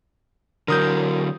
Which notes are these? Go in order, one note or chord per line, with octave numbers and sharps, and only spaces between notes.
D3 F#3 A#4 D#6 G6